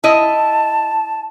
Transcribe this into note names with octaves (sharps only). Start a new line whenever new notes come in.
E4 D#5 A5